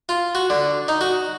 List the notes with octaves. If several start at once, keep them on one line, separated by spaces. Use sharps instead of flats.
F4
F#4
D3
D#4
F#4